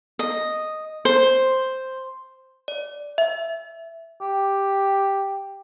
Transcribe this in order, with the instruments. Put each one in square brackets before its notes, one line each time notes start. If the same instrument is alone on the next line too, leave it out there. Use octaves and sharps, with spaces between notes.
[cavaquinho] D#5
C5
[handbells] D5
E5
[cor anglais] G4